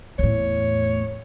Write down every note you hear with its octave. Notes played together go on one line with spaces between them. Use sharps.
E2 A2 C#5